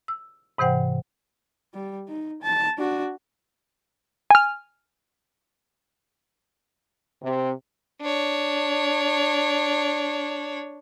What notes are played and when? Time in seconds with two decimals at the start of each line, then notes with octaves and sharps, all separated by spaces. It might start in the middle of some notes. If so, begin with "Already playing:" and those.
0.08 E6
0.58 G#2 C3 E3 C5 F#5 G5
1.74 G3
2.09 D#4
2.42 A5
2.78 D4 F#4
4.31 G#5 F6
7.22 C3
8.02 D4 C#5